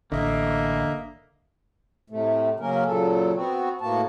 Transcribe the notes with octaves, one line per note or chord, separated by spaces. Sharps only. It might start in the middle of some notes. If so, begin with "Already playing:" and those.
A1 D3 A#3 D#5 E5
A2 C3 A3
C#3 F#3 A#3 C#4 A#4
A#2 C#3 F#3 A4
B3 C4 F#4
A2 A#3 B3 F#4 A5